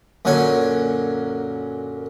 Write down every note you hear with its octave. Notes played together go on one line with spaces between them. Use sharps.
F#2 A#2 D3 C#5 G#5